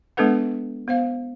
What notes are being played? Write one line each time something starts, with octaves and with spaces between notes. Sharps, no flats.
G#3 B3 D4 A4 B4 F#5
B3 C5 F5